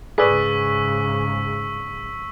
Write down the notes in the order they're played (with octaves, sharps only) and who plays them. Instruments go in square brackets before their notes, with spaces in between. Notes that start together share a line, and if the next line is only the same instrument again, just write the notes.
[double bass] G#2 C#3 [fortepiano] G#4 B4 D5 [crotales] C#6 E6 B6